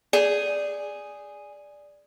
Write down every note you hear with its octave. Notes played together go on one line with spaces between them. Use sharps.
G#4 D5